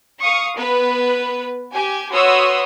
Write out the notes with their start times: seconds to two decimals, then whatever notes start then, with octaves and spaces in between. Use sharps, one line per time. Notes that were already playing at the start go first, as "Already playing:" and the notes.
0.21 F5 C#6 D#6
0.57 B3 B4
1.73 G4 G#5
2.12 F#4 B4 C#5 C6 D#6 E6